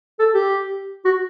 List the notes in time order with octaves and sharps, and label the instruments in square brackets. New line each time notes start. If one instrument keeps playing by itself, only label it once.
[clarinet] A4
G4
F#4